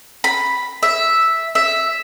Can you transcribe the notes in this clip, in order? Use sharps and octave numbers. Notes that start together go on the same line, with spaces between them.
B5
E5
E5